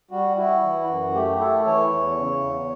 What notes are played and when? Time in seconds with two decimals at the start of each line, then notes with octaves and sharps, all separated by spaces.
0.11 G3 F#4
0.37 E4 F#4
0.63 E3
0.88 F#2
1.14 A3 G4
1.40 E4 A4
1.66 E3 C#5
1.91 E2
2.17 C#3
2.43 E2